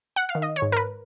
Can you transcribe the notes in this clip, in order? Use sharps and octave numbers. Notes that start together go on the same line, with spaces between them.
F#5
F5
D#3
D#5
C#5
G#2
A#4
B4